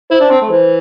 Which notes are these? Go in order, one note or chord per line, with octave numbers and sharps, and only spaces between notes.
E4 C5
D4
C4 A5 C6
A3
E3 C5